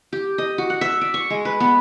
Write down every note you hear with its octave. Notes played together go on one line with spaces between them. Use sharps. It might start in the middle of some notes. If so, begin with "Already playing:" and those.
G4
D#5
F#4
F#5
E5
D5
C#6
G#3
B4
B3